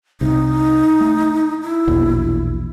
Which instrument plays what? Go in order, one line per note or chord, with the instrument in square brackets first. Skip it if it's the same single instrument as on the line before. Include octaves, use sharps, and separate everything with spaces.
[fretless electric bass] C2 C3 [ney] D#4
[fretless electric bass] A3
[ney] E4
[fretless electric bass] A#1 E2 B2